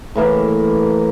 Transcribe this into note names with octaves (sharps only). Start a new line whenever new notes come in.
A2 E3 A#3 E5